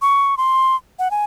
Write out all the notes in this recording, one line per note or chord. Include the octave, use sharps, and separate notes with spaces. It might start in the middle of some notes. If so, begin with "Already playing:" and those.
C#6
C6
F#5
G#5